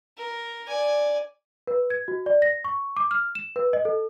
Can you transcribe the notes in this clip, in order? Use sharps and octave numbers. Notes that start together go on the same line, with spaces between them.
A#4
D5 G#5
B4
G#6
F#4
D5
A#6
C#6
D6
F6
E7
B4
D#5
A4